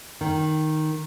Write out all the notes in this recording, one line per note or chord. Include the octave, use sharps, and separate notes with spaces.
D#3